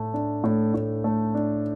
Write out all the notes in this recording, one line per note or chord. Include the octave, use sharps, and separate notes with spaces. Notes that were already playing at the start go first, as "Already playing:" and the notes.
Already playing: A2 A3
D4
A2
A2
A3
D4